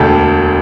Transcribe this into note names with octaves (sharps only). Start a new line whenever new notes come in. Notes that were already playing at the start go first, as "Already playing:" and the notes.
Already playing: E1 D2 D3 G5 A5